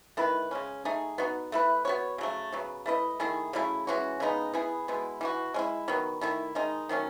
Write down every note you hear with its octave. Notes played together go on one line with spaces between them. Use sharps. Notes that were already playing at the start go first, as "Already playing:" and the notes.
D#3 A3 E4 B4
C#3 G#3 C#4
A3 D#4 G#4
B3 D#4 F#4
A3 E4 B4
B3 F#4 C#5
C#3 F#3 A3
C#3 F#3 B3
A3 E4 B4 D#5
D#3 A3 E4 G#4
C#3 F#3 A3 E4
E3 G#3 C#4 F#4
C#3 G#3 B3 D#4
B3 E4 G#4
B2 G#3 B3 E4
E3 B3 F#4
G#3 C#4 E4
D#3 F#3 B3
D#3 A3 E4
D#3 G#3 D#4
D#3 F#3 A3 C#4